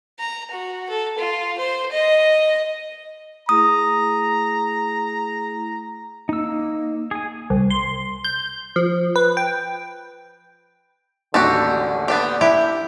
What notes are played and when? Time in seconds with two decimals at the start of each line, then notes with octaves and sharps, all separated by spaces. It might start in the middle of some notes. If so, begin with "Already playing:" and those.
0.19 A#5
0.51 F#4
0.89 A4
1.19 F4
1.58 C5
1.92 D#5
3.49 A3 E4 G#4 A#5 D#6
6.29 A#3 D#4 E6
7.11 G#4 G#5
7.50 C2
7.70 C6
8.24 G6
8.76 F3
9.16 B4
9.37 G5
11.34 A1 D#2 D3 F#4 G4 A4
12.08 B3 D4 G4
12.41 E4 G4